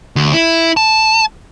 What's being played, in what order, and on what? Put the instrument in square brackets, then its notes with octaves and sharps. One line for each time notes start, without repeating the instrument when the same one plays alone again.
[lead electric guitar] D2
E4
A5